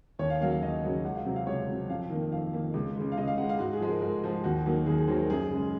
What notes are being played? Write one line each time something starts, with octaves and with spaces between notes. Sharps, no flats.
D#2 C#5
F5
C#3 F#3 A#3 F5
F5
D#2 D#5
C#3 F#3 A#3
C#2 F#5
F5
C3 F#3
F5
C#2 C#5
C3 F#3
F2 F5
D#3 A#3
F2 F5
D#3 A#3
C#2
C#3 G#3
F5
C#2 D#5
F5
C#3 G#3 F#5
F5
G#2 F#4
G#4
F3 G#3
A#4
G#2 A#4
F3 G#3
D#2 F#4
D#3 F#3 A#3
D#2 G#4
G#4
D#3 F#3 A#3 C5
A#4
F#2 G#4
C#3 G#3